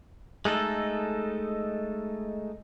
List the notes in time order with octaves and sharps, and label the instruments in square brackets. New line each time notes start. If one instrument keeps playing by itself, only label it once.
[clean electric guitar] G#3 A3 D#4 A4